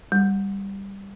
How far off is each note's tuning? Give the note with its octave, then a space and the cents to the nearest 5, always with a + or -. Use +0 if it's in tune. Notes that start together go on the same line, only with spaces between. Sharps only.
G3 +10